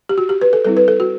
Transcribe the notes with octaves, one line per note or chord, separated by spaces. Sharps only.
G4
F#4
G4
B4
A4
G3 C4 E4 A4
B4
A4
F#4